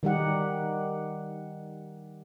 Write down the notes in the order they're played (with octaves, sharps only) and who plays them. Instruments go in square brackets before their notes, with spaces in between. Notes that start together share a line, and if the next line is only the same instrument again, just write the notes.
[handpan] D#3 G3 D#4 G4 F#5